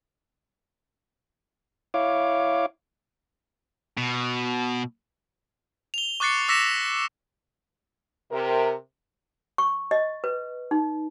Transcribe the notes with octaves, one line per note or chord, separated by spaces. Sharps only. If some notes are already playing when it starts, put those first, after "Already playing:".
E4 C#5 F5 D6
B2
F7 G7
C#6 D6 F#6 A6 C7 C#7
D6 E6 A#6 B6 C#7 E7
C3 A#4
C#6
D#5
B4
D#4